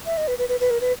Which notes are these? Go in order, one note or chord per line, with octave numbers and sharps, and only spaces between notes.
E5
D#5
B4
B4
B4
B4
A#4
B4